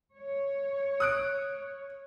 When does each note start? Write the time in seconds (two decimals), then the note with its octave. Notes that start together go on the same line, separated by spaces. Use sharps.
0.15 C#5
1.00 D#6 F#6 D7